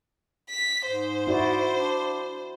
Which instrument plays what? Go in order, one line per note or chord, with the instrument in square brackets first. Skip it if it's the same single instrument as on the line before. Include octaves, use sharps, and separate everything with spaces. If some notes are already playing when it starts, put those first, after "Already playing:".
[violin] B6
[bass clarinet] G#2 [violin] C5
[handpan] E4 F#4 D5
[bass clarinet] D4